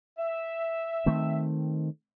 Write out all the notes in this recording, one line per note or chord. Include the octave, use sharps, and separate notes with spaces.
E5
D#3 A3 C4